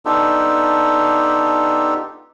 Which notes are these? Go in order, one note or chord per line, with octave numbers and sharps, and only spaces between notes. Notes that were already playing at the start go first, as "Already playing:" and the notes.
B3 D4 D#4 F4 G4 A4